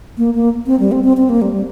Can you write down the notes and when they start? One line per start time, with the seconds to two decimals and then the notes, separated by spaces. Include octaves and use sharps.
0.18 A#3
0.34 A#3
0.66 C4
0.80 G3
0.92 C4
1.04 C4
1.17 C4
1.29 A#3
1.42 G3
1.53 G3